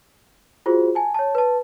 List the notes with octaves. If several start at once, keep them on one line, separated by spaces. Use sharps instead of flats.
F4 F#4 G#4 C5
G#5 A5
C#5 A5
B4 A5